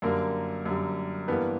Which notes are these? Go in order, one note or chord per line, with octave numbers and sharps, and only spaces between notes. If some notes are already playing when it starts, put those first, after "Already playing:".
F#2 D3 G3 A#3 A#4
F#2 D3 G3
G2 E3 G3 A#3 B3 B4